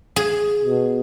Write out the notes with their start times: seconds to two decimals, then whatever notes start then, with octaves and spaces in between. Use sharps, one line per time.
0.16 G#4
0.64 B2